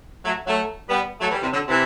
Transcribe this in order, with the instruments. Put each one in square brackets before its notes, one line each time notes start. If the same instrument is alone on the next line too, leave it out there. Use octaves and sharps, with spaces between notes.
[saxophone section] F#3 A3
F#3 A3
G3 B3
F#3 A3
E3 G3
C3 E3
D3 F#3
C3 E3